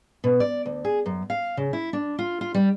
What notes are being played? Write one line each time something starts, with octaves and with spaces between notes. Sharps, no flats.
B2
D5
D2
G#4
F#2
F5
C#3
E4
D4
F4
F4
G3